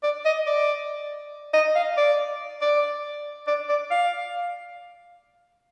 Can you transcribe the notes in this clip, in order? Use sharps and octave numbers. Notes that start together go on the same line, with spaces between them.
D5
D#5
D5
D#5
F5
D5
D5
D5
D5
F5